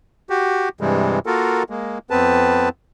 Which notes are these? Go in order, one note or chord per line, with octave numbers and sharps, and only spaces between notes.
F#4 G4
G2 C3 E3 G3 G#3
A#3 F4 F#4 A4 A#4
G#3 A#3
F2 B3 C4 B4 A5